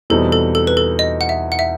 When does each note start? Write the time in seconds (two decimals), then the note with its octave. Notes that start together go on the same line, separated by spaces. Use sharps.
0.10 E2 B2 G3 C4 D#4 A4
0.32 A4
0.55 A4
0.67 B4
0.77 A4
0.99 D#5
1.21 F#5
1.29 E5
1.52 F#5
1.59 E5